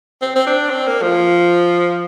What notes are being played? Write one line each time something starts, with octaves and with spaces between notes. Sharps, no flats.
C4
C4
D4
C4
A#3
F3